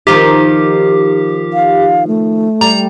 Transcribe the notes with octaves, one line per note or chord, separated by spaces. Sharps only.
D#3 F3 D#4 G4
F5
A3
G3 A#5